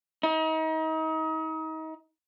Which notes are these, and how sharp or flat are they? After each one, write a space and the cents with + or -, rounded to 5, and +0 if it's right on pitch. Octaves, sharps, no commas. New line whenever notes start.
D#4 +35